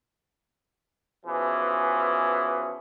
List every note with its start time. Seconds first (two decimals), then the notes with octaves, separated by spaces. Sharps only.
1.26 B2 E3 F3 C#4 G#4